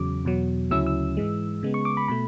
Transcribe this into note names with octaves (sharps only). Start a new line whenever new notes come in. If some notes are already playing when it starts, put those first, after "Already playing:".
Already playing: E2 C#3 F#3 D6
E2 B2 F#3
D2 C#3 F#3 C#4 E4 E6
E6
G#2 E3 G#3
C#3 G#3 B3
C#6
D6
B5
B2 A3 B5